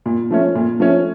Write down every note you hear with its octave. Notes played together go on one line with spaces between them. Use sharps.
A#2
F3 A3 C#4
A#2
F3 A3 C#4